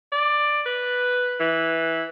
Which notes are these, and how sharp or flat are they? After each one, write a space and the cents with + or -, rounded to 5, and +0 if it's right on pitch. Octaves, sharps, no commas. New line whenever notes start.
D5 +10
B4 +0
E3 -10